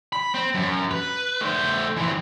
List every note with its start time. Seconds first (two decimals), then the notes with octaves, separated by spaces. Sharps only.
0.13 B5
0.34 C4
0.55 F#2
0.91 B4
1.41 A3 C5
1.97 E3 C4